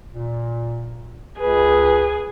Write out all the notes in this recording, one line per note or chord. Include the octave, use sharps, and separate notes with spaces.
A#2
C#2 G#4 B4